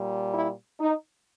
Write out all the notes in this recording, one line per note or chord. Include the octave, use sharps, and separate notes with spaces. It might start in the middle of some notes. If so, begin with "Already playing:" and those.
Already playing: A#2 G3
E4
D#4